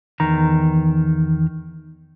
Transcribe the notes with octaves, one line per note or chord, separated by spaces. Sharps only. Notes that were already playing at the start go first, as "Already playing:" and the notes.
E2 D#3 A#5